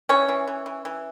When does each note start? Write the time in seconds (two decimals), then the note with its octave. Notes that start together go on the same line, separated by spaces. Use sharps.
0.09 E3 C#4 C#5
0.29 E3
0.47 E3
0.66 E3
0.85 E3